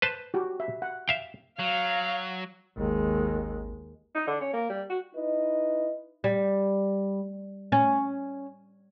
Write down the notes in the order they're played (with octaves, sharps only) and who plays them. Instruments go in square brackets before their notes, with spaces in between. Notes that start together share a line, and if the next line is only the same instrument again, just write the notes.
[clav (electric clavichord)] B4 C5 A5
[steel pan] F#4 G4
E5
F#5
[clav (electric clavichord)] E5 F5 G5
[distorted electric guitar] F#3 [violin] F5
[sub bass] G#1 [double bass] D#2 G#3
[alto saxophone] D#4
D3
C#4
A#3
G3
F#4
[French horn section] D#4 E4 B4 D#5
[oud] G3
C#4